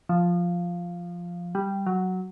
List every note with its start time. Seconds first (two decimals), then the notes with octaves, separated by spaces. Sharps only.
0.09 F3
1.55 G3
1.87 F#3